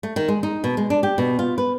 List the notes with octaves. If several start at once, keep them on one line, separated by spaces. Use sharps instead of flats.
A3
D#3
G#3
D#4
B2
G#3
D4
G4
B2
F4
B4